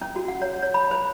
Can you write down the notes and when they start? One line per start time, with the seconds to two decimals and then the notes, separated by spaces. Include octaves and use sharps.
0.01 C#4
0.16 F#4
0.28 F#5
0.42 C#5
0.62 C#5
0.74 B5
0.91 C5